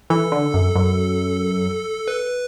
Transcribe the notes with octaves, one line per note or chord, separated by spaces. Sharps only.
E3 A4
D3
F#2
F#2
B4